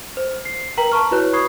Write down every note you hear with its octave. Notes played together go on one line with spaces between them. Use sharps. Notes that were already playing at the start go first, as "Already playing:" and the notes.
C5
C7
A#4 B4 G5 A#5 B6 F#7
A5 A#5 C#6 F6
E4 F#4 B4 C#5 F#6
B5 C#6 D#6 G#6 C7